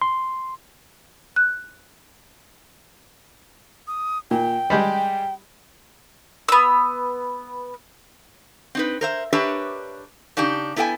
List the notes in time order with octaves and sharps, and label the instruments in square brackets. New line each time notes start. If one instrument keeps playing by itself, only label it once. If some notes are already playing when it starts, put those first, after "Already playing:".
[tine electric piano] C6
[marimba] F#6
[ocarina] D#6
[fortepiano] A#2 [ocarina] G5
[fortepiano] G3 G#3 G4
[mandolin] B3 E6
[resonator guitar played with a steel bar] C4 D#4 B4
A#4 C5 E5
D4 G4 A#4 B4 C#5 E5
C#3 D4 D#4 G4
B3 E4 A4 E5 G5 G#5